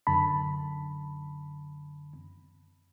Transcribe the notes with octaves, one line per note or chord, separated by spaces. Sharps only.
F#2 D3 A5 B5